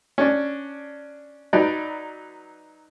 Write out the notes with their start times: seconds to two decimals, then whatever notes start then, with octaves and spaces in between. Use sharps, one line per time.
0.18 C#4 D4
1.53 F#3 D#4 B4 D5